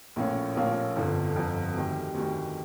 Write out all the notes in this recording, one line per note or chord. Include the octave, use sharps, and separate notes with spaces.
A#1 A2 F3 A#3 C#4
A#1 A2 F3 A#3 C#4
G1 F2 D3 F3
G1 F2 D3 F3
D2 C3 D#3 G3
D2 C3 D#3 G3